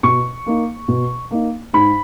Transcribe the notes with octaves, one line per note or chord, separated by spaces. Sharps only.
B2 C#6
A#3 D#4
B2
A#3 D#4
G#2 B5